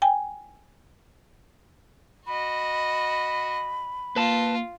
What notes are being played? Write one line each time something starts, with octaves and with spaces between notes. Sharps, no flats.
G5 G#5
F#4 D#5 B5
A#3 F4 B4 A5